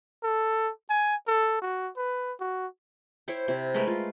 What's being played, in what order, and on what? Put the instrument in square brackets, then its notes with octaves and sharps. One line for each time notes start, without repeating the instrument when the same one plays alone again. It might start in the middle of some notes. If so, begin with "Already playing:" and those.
[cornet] A4
G#5
A4
F#4
B4
F#4
[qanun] E4 C5 C#5 G5
C3 E4
G#3 A3 A#4 B4
F4